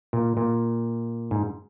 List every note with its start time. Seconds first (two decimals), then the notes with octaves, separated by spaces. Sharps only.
0.13 A#2
0.37 A#2
1.31 G#2